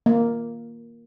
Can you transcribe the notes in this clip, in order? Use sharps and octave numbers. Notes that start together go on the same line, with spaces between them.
A#3